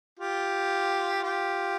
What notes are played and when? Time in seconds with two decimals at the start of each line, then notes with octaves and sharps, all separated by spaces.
0.19 F4 G4
1.23 F4 G4